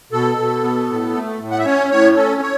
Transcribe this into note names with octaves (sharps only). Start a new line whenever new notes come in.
B2 A4
B2
B3
A2
A3
A2
F#5
E5
C#4 C#5
A2 C#5
C#4 A4
C#5